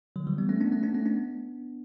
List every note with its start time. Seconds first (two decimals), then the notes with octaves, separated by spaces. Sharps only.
0.16 D3 F#3
0.27 E3 G3
0.38 G3 B3
0.49 A3 C#4
0.61 B3 D4
0.72 A3 C#4
0.83 B3 D4
0.95 A3 C#4
1.06 B3 D4